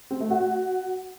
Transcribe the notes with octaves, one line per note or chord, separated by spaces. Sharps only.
C4
A3
F#4